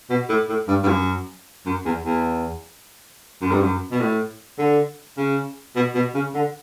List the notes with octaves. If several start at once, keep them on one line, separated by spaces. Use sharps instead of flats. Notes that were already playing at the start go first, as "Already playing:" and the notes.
B2
A2
A2
G2
G2
F#2
F#2
E2
E2
F#2
G2
F#2
B2
A2
D3
C#3
B2
B2
C#3
D3